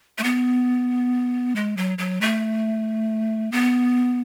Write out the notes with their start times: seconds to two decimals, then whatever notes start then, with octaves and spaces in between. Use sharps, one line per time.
0.18 A3
0.24 B3
1.56 G#3
1.77 F#3
1.98 F#3
2.21 A3
3.52 B3